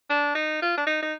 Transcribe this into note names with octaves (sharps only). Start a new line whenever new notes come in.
D4
D#4
F4
D4
D#4
D#4